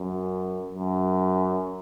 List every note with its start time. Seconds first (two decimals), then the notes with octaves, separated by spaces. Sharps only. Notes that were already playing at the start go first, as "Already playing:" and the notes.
Already playing: F#2
0.75 F#2